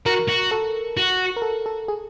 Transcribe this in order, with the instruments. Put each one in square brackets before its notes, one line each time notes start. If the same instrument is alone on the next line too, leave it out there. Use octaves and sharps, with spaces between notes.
[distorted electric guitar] F#4 [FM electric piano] A#4
[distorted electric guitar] F#4
[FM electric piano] A4
[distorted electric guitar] F#4
[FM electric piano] A#4
A4
A4
G#4